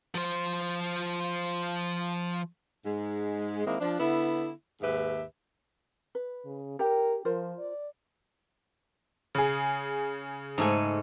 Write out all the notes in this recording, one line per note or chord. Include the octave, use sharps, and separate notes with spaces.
F3 C5
G#2 G#3
D#3 G#3 A#3 C4 E4
F3 D4
D3 B3 E4
D#2 G#2 G4 B4 E5
B4
C#3
G4 A#4 G5
F3 F4 A#4 C5
D5
C#3 G#4
G#2 A3 G#5